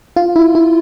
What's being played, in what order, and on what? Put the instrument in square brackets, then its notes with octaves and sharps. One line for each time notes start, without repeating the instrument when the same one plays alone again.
[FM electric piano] F4
E4
E4